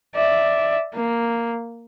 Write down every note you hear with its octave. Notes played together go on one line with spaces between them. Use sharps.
D5 E5
A#3